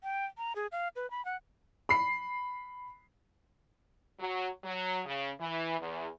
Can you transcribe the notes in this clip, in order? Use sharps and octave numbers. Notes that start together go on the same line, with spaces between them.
G5
A#5
G#4
F5
B4
B5
F#5
B5 C7
F#3
F#3
C#3
E3
E2